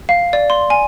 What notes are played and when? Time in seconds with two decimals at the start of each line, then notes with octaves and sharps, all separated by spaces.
0.09 F5
0.33 D5
0.50 C6
0.70 G#5